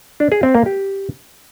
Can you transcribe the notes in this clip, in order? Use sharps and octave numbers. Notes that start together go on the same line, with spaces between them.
D4
G#4
C4
A#3
G4